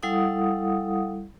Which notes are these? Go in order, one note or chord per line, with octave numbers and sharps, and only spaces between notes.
G3 E4 A4 F5 F#5 D#6